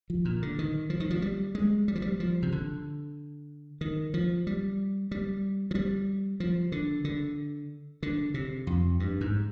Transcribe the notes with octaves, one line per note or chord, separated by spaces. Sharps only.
F3
A#2
D3
D#3
F3
D#3
F3
G3
G#3
G3
F3
G3
F3
C3
D3
D#3
F3
G3
G3
F3
G3
F3
D3
D3
D3
C3
F2
G2
G#2